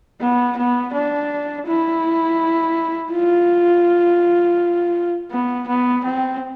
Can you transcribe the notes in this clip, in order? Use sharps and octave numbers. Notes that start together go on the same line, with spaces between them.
B3
B3
D4
E4
F4
B3
B3
C4